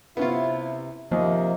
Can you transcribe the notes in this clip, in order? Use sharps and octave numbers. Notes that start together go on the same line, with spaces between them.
C3 B3 C#4 E4 F4
D#2 C3 F3 A#3 D#5